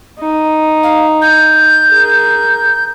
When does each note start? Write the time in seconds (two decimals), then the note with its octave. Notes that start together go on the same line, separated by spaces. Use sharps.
0.20 D#4
0.83 F5
1.22 G6
1.90 G#4 A#4